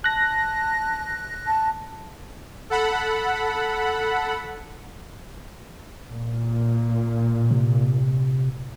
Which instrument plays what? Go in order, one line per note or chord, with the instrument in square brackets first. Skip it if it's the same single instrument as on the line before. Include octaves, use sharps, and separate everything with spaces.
[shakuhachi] A5 [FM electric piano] F#6 A#6
[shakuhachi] A5
[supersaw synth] A4 F#5 B5
[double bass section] A#2
[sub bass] C3